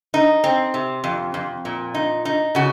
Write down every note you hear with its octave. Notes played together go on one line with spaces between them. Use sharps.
D#4
C4
C3
F2
F2
A#2
D#4
D#4
C#3 F#4